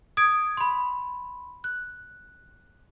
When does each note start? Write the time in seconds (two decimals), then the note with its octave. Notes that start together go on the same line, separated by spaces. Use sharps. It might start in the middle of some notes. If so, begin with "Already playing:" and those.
0.17 D#6 G#6 D7
0.57 B5 C6
1.64 F#6